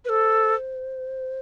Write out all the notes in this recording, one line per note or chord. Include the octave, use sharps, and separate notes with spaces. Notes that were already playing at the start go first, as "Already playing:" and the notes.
A4 B4 C5